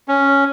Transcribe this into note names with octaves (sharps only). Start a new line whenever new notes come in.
C#4